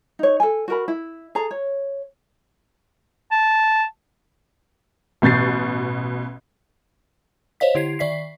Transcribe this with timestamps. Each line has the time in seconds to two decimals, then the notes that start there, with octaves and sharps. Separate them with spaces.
0.19 D#4 C#5
0.40 A4 G#5
0.68 F#4 A#4 B5
0.88 E4
1.35 G#4 A4 A#5
1.51 C#5
3.32 A5
5.22 A1 B2 G6 A6 C7
7.60 C5 C#5 D#5 F5 B6
7.75 D3 E4 G4 G#6 C7
7.99 D#3 D5 E5 B6 C7